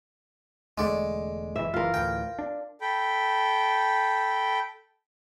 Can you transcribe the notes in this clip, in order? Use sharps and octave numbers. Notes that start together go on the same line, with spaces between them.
E1 D3 G#3 A3 D5
F#1 B2 E3 E5
F#1 E3 F4 A#4
D2 A2 E3 G5
D4
A4 G5 B5